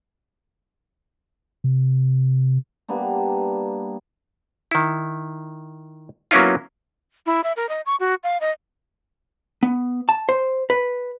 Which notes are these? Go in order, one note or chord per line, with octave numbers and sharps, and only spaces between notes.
C3
G3 A#3 B3 D4
D#3 E4
F#3 A#3 B3 C#4 E4 F4
E4
E5
A#4
D#5
C#6
F#4
F5
D#5
B3
A5
C5
B4